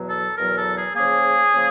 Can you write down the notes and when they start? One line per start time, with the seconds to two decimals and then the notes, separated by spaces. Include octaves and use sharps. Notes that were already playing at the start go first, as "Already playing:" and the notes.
Already playing: E2 B2 F#3
0.09 A4
0.38 E2 B2 F#3 A#4
0.57 A4
0.76 G#4
0.95 C#3 F3 A#3 G#4
1.53 C#3 F3 A#3